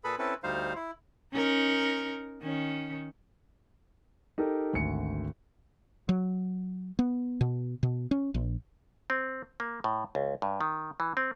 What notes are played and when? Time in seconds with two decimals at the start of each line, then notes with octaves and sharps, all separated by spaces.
0.04 A#2 G#4 A4 B4 B5
0.19 C4 C#4 E4 A4 B4
0.44 D2 G3 D#4 C5 F5
0.76 E4
1.33 C#4 D#4 A#4
2.42 D#3 C#4
4.38 D#4 G4 A4 A#4
4.73 G#1 D2 G#5 C#7
6.09 F#3
6.99 B3
7.41 B2
7.83 B2
8.11 C#4
8.34 A#1
9.10 C4
9.60 A#3
9.84 A2
10.15 C#2
10.42 G2
10.61 D#3
11.00 E3
11.17 C4